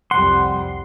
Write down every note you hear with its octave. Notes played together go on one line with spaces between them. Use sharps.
C2 F2 G3 F#5 C6